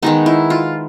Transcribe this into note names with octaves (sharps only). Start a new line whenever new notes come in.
D#3 G#3 B3 D#4
E4
F4